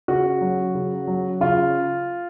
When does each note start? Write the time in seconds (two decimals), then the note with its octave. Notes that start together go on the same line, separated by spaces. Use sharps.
0.08 C#3 F#4
0.41 F#3
0.75 C#3
1.07 F#3
1.41 C#3 F4